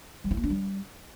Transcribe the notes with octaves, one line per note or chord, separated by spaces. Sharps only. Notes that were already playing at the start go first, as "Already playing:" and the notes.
G3
E4
A#3
D4
G3